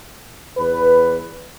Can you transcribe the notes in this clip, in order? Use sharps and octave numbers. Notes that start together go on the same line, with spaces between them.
E2 B4